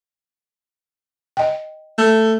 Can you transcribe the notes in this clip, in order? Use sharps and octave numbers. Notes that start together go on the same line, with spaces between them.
D#5 G5
A3